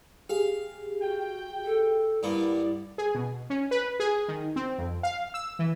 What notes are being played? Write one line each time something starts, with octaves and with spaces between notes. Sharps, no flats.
G4 G#4 F5
F#4 G5
A4
G2 A#3 B3 E4 D5
G#4
B2
C#4
B4
G#4
D#3
C4
F2
F5
E6
E3